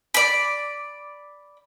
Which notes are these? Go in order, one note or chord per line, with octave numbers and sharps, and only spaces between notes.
D5 B5